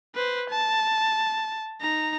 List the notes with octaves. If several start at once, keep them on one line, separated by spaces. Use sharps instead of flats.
B4 C5
A5
D#4 A#5